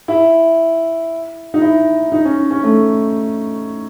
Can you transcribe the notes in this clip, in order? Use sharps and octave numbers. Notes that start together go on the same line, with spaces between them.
E4
D#4
E4
D#4
C#4
C#4
A3